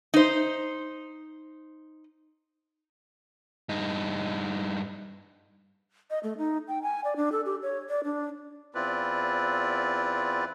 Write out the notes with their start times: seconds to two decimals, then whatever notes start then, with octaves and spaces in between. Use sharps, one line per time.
0.14 D#4 C5
3.69 G2 D#4
6.10 D#5
6.23 A3
6.38 D#4
6.68 G5
6.82 G#5
7.04 D5
7.16 D4
7.32 A4
7.46 G4
7.62 C#5
7.89 D5
8.04 D4
8.75 E2 C4 E4 F4 B4 D5